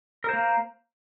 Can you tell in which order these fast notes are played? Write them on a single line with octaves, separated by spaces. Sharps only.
A#4 C5 A#3